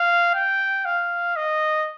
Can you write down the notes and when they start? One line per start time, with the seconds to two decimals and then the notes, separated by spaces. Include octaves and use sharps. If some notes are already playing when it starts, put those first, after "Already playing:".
Already playing: F5
0.35 G5
0.85 F5
1.37 D#5